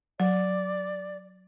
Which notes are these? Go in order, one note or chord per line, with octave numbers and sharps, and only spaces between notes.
F#3 D5